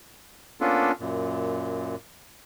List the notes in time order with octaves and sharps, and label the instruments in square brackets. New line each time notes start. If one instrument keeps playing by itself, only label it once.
[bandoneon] A#3 B3 C#4 D4 F4 A4
F#2 A#2